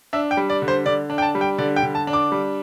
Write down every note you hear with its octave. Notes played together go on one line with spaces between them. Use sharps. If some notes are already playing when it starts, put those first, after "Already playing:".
D4 E5
G5
G3
D5
D3
C5
D3 D5
D4
G5
A5
G3
G5
D3 D5
G5
D3
A5
D4
D6
G3